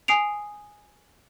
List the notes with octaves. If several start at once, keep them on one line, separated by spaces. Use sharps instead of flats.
G#5 D#6 C7 D7 F7